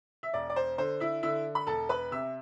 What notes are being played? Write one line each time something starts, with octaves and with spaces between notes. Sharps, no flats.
E5
E1 D5
D5
C5
D3 C5
E4 E5
D3 E4 E5
B5
E1 A4 A5
B4 B5
C3 E5 E6